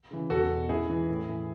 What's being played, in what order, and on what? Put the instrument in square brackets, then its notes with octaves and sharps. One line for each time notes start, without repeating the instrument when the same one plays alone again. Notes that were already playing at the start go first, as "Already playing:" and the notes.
[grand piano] C#3 E3
E2 F#4 A4
B2
G#2 E4 G#4
E3
A2
E3